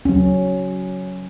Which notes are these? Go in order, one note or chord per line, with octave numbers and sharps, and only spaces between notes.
F#3 C#4